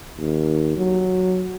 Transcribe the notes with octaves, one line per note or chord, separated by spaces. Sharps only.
D#2
F#3